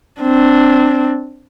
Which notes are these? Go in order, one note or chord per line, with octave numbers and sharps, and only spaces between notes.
C4 D4